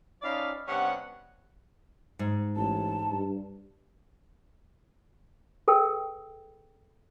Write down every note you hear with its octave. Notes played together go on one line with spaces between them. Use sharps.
F3 C#4 D#4 D5 F5 B5
G2 C3 B3 C#4 F#5
G#2
A1 A5
G2
G#4 A4 B4 G5 E6